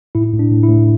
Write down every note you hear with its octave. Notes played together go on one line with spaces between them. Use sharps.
A2 E4
A2
D4
A2
E4
A2